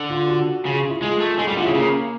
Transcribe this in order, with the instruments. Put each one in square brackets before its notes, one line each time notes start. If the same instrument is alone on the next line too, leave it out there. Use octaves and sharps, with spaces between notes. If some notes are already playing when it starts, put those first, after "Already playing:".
Already playing: [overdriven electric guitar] D3
[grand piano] F4
F#4
[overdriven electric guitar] C#3 [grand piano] F4
[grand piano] F4
E4
[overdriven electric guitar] G#3 [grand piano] F4
[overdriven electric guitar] A3
[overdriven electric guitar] G#3 [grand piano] F4
[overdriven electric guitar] G3
[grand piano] F4
[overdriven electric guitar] D3
[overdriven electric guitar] C#3 [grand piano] E4
[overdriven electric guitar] C#3 [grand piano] A#3